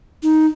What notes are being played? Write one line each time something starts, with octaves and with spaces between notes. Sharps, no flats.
D#4